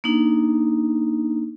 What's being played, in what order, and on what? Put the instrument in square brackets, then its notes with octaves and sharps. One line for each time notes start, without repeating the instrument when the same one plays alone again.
[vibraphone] A#3 D4 D#4